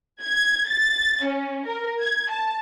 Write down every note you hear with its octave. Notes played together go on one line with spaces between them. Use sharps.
G#6
A6
C#4
A#4
G#6
A5